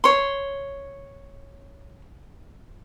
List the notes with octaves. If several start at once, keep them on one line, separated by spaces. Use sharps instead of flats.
C#5 C6